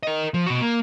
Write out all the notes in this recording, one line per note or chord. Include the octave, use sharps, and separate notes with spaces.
A#4 D#5
F3
B2 F#4
A#3